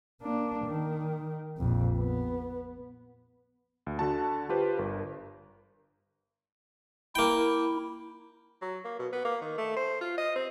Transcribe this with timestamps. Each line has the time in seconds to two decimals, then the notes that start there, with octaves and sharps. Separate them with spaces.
0.22 A#3 D4
0.66 D#3
1.58 A#1 F2
1.98 B3
3.86 D2
3.99 D3 F#4 A5
4.49 F4 G4 B4 C5
4.78 G1 A#4
7.15 A#3 E4 G5
8.62 F#3
8.84 A#3
8.99 B2
9.12 B3
9.24 A#3
9.41 D#3
9.58 A3
9.76 C5
10.01 F4
10.18 D#5
10.35 C4